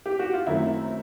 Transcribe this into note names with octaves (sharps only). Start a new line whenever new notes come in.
G4
F#4
F4
F#2 D#3 F#3 A3 C4 E4